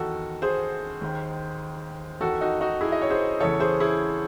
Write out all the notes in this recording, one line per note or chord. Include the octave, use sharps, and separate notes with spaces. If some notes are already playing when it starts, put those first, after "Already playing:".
Already playing: E2 D#3 F#4 A4
G#4 C5
D#2 D#3
E2 D#3 F#4 A4
D#4 F#4
D#4 F#4
E4 G#4
D#5
C#5
G#4 C5
E2 C#3 E3 A4 C#5
G#4 C5
E4 G#4